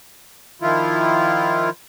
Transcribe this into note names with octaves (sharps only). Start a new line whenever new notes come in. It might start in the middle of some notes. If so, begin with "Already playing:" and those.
D#3 F3 E4 F4